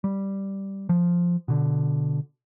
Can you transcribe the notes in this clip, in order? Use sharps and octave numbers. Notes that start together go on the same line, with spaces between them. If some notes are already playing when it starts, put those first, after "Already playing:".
G3
F3
B2 D3